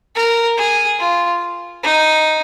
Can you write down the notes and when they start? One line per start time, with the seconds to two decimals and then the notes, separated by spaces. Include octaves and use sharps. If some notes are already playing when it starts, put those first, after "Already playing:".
0.16 A#4
0.58 G#4
0.99 F4
1.84 D#4